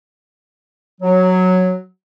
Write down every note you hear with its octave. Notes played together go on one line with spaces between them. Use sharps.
F#3